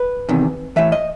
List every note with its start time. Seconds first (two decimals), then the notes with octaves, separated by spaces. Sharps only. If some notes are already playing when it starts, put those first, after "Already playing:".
Already playing: B4
0.29 E2 C3 D#3
0.76 A2 E3 E5
0.92 D#5